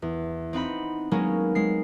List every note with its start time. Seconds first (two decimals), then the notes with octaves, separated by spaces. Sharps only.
0.02 E2
0.53 C4 D#4 F#5 B5
1.11 F#3 G#3 A#3 B3 C#4 D#4
1.55 G#3 C7